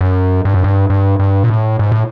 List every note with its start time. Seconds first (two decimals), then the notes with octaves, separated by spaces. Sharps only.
0.01 F#2
0.45 G2
0.54 F#2
0.64 G2
0.90 G2
1.19 G2
1.44 A#2
1.50 A2
1.79 G#2
1.92 A2